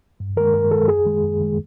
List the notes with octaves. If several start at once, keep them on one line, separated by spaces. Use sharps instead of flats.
G2
D#3 G#3 A#4
G2 A#4
D#3 G#3 A4
F#2 G#4
D#3 G#3
F#2
D#3 G#3